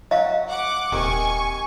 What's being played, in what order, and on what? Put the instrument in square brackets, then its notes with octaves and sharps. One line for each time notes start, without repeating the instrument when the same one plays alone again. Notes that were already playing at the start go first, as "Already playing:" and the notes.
[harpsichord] F#3 F#4 [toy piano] D#5 F5
[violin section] F#5 D6
[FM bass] D#1 [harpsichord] C3 D#3 [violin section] G#5 C#6